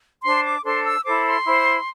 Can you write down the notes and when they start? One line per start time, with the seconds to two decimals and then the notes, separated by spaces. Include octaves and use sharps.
0.23 D4 C5 C6
0.44 D6
0.63 D4 A4 C5 C6
0.84 E6
1.04 E4 A4 C5 D6
1.25 C6
1.45 E4 C5